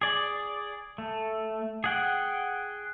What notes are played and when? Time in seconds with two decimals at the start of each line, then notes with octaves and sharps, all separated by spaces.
0.01 G#4 D5
0.98 A3
1.84 G#4 F#5 G5